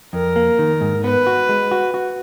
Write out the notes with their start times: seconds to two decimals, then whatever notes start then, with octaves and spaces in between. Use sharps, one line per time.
0.13 F2 A#4
0.36 A#3
0.59 D#3
0.81 G#2
1.03 B3 B4
1.27 F#4
1.49 G#3
1.71 F#4
1.94 F#4